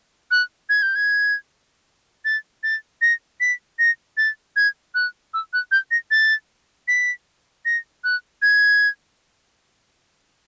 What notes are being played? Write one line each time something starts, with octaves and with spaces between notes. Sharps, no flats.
F#6
G#6
G6
G#6
A6
A6
A#6
B6
A#6
A6
G#6
F#6
E6
F#6
G6
A#6
A6
B6
A#6
F#6
G#6